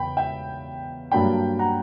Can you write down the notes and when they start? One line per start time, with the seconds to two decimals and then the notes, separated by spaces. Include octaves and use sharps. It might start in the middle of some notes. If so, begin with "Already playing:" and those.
Already playing: E2 C#3 G5 B5
0.17 E5 G5
1.11 G2 F#3 A#3 D4 G5 B5
1.59 F#5 A#5